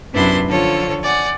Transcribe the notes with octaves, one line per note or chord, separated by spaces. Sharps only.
F#2 C3 B3 D4 E4 C6
D3 F3 F4 A4 C#5
D5 F#5 G#5